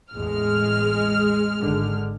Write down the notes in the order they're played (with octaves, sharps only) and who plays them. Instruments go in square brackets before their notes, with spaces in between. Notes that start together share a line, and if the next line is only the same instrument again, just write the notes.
[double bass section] A1 E2 A2 [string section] G#3 F6
[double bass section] G#1 D3